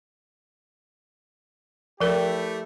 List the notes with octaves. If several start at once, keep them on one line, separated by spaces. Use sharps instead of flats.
F3 A3 E4 G4 A#4